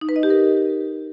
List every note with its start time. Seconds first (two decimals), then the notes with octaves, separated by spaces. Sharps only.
0.01 D#4
0.09 B4
0.16 D#5
0.23 G4
0.30 A#4